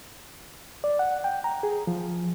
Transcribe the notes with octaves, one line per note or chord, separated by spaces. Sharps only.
D5
F#5
G5
A#5
G#4
F3